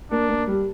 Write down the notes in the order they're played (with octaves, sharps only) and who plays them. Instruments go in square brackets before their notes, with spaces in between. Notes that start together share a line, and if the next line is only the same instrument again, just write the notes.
[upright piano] A#3 [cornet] D4
[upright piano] A#3
G3